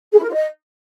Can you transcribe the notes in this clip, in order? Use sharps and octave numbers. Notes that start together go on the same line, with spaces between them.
G#4
E4
A#4
F4
D#5